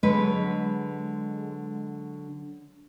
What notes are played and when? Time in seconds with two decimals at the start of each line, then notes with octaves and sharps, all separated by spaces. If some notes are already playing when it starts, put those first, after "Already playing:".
0.03 D3 F#3 G#3 B4